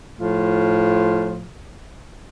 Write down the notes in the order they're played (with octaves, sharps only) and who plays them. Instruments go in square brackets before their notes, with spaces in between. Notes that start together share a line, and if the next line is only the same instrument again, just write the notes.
[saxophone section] A2 F3 F4